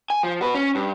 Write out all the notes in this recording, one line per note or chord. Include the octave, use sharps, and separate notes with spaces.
G#5
F3
F#4 B4
C#4
G2